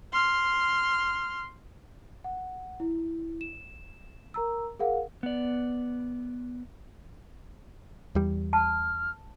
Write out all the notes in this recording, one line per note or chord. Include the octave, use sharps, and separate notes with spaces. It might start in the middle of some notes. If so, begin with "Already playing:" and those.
C6 F6
F#5
E4
E7
A#4 A#5 E6
G#4 A#4 F5 F#5
B3 D5
E2 G3
A5 F6